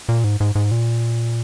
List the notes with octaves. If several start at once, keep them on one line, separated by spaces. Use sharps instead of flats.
A#2
G#2
G#2
G#2
A#2